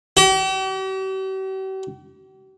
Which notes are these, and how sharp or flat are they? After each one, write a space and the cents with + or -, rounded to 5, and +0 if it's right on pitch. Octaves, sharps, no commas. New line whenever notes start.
G4 -45